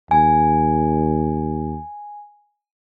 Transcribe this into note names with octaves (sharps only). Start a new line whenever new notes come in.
D#2 G#5